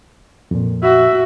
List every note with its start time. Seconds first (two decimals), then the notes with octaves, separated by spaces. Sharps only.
0.51 F2 A#2
0.83 F#4 E5